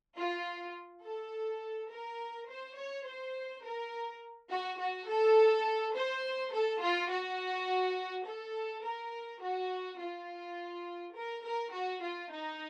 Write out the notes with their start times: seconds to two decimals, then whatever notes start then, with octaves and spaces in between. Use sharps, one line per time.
0.17 F4
1.03 A4
1.90 A#4
2.48 C5
2.77 C#5
3.06 C5
3.63 A#4
4.50 F#4
4.80 F#4
5.08 A4
5.95 C5
6.53 A4
6.82 F4
7.10 F#4
8.26 A4
8.84 A#4
9.42 F#4
10.00 F4
11.15 A#4
11.44 A#4
11.73 F#4
12.02 F4
12.30 D#4